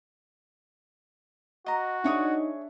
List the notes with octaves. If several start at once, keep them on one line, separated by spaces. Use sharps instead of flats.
F#4 D#5 A#5
D4 D#4 G#4 C#5 E5 D#6